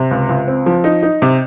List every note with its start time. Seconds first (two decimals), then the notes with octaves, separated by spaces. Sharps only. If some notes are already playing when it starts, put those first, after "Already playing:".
Already playing: C3
0.11 C#2
0.29 C#2
0.47 C4
0.66 F3
0.84 D#4
1.03 D#4
1.22 C3